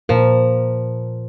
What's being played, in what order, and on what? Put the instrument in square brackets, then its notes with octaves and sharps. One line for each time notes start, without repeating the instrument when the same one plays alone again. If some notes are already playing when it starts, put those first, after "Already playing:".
[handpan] A#2 A#4 [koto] F3